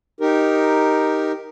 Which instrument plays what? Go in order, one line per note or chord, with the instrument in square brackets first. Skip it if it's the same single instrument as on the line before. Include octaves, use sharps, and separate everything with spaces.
[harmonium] D#4 G4 A#4